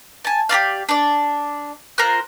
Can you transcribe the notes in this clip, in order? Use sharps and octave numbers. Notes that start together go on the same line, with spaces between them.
G#5 A5
G4 A#4 D5 F5
D4 D5
F4 A#4 C5 F#6